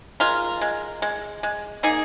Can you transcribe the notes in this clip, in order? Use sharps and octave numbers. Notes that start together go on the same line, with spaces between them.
G#3 F4 A#4
G#3
G#3
G#3
A#3 D#4 G#4